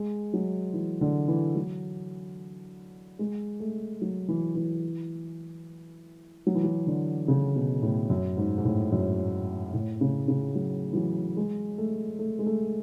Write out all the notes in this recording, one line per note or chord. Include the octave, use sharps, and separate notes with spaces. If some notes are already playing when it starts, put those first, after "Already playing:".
Already playing: G#3
F#3
E3
D3
E3
F#3
G#3
A3
F#3
E3
E3
F#3
E3
F#3
D3
C#3
B2
A2
F#2
G#2
G#2
A2
F#2
A2
C#3
C#3
F#3
E3
F#3
G#3
A3
A3
G#3
A3